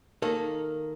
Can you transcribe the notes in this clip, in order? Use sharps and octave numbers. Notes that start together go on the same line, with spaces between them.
D#3 A#3 A4